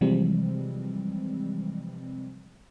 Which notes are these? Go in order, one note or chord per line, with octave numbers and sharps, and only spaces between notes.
C3 E3 F3 G3 G#3 C4